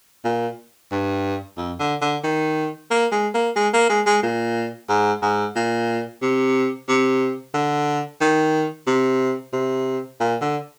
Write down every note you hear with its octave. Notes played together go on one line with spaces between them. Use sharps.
A#2
G2
F2
D3
D3
D#3
A#3
G#3
A#3
G#3
A#3
G#3
G#3
A#2
G#2
G#2
A#2
C3
C3
D3
D#3
C3
C3
A#2
D3